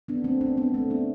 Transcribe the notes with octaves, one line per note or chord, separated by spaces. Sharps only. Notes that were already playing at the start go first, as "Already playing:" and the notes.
B3 D4
A3 C4
B3 D4
B3 D4
A3 C4
B3 D4